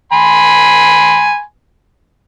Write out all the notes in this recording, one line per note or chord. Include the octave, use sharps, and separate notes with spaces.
G#5 B5 C6